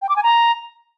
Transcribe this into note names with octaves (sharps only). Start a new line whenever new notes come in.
G5
D6
G#5
A#5